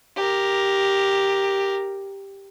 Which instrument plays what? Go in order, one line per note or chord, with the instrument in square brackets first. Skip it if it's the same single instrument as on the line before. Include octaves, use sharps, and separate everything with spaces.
[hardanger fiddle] G4 A#4